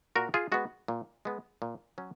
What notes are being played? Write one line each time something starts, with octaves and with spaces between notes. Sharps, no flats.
A#2 F#4 A#4
F4 G#4
G#3 B3 F#4
A#2
G#3 B3
A#2
F#3 C#4